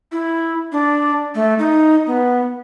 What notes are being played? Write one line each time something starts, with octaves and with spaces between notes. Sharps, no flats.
E4
D4
A3
D#4
B3